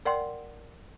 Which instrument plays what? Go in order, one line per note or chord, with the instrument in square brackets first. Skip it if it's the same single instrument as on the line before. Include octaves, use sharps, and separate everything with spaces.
[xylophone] A#4 D5 F#5 G5 C6